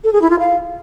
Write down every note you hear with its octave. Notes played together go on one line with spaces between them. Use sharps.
A4
G#4
E4
F4
F5